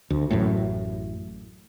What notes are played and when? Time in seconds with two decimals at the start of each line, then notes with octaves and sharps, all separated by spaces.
0.10 D2
0.31 A1 F#2 A2